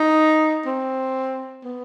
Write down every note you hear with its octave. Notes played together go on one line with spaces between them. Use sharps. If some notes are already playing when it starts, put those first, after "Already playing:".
Already playing: D#4
C4
B3